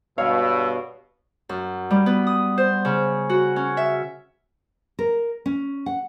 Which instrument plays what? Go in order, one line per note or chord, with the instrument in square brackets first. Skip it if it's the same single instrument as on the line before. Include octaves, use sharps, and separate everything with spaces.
[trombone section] G2 B2 [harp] C#5 [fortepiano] F5 [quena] E6
[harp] F#2
G3
B3
D#6
C5
C#3
F#4
C#4
E5
[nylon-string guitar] A#4
C#4
F#5